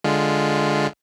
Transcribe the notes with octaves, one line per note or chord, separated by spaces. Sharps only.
D3 G#3 F4